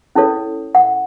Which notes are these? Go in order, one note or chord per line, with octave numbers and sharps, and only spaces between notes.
C#4 E4 A4 C#5
F#5